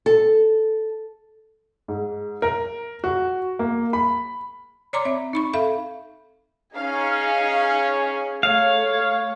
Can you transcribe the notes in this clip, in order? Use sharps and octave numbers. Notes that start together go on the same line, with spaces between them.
A4
G#2
A#4
F#4
A#3
B5
C#5 D5 A#5 C6 D6
C4 E5
D#4 B5 C#6
A4 E5 F5 B5
C#4 D#4 G#4 F5
A3 C#5 F5